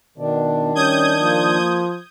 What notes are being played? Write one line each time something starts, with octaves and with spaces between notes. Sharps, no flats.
B2 D#3 D4
G3 C#4 D#6 G6 G#6
F3 A#3